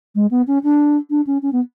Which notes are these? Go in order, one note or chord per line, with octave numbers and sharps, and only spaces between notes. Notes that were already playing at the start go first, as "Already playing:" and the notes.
G#3
B3
C#4
D4
D4
C#4
C#4
B3